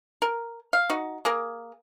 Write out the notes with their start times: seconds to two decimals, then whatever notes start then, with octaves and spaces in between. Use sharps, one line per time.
0.22 A#4
0.73 F5
0.90 D#4 F#4
1.25 A#3 G#4 A#4